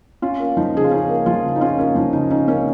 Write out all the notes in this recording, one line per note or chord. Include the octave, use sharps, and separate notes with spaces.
C#4 F4
A#3
F3 D#4
C#3 G#4
F4
C#4 D#4
A#3
F3 F4
C#3
D#4
C#4 F4
A#3 C#4
F3 D#4
C#3 D#4
C#4 D#4
A#3 C#4